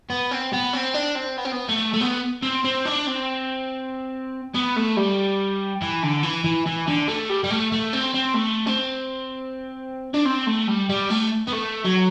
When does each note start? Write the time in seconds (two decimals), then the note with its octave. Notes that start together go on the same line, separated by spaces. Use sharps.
0.10 B3
0.31 C4
0.53 B3
0.74 C4
0.94 D4
1.16 C4
1.37 B3
1.45 C4
1.52 B3
1.69 A3
1.93 A3
2.01 B3
2.42 C4
2.65 C4
2.85 D4
3.07 C4
4.54 B3
4.76 A3
4.97 G3
5.82 E3
6.03 D3
6.23 E3
6.44 E3
6.66 E3
6.87 D3
7.08 A3
7.29 G3
7.44 G3
7.50 A3
7.72 A3
7.93 C4
8.14 C4
8.35 A3
8.67 C4
10.14 D4
10.25 C4
10.47 A3
10.68 G3
10.89 G3
11.10 A3
11.47 B3
11.52 A3
11.85 F#3